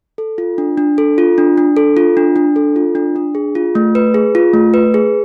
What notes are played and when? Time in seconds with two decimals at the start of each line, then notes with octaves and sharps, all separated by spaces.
0.18 A4
0.38 F4
0.58 D4
0.78 D4
0.98 A4
1.18 F4
1.38 D4
1.58 D4
1.77 A4
1.97 F4
2.17 D4
2.36 D4
2.56 A4
2.76 F4
2.95 D4
3.16 D4
3.35 G#4
3.55 F4
3.75 A3
3.95 B4
4.14 G#4
4.35 F4
4.54 A3
4.74 B4
4.94 G#4